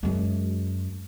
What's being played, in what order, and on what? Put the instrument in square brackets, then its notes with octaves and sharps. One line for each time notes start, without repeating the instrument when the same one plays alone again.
[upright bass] F#2 G#3